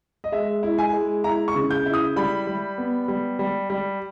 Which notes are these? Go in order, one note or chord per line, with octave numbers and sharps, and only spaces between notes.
D#5
G#3 E5
E4
G#5
G#3
E4 A#5
C#6
C#3
G6
E4
D#6
G3 B5
G3
B3
G3
G3
G3